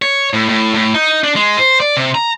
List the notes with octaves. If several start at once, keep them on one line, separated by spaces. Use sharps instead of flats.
C#5
A2
A2
A2
D#4
D4
G#3
C5
D5
C3
A#5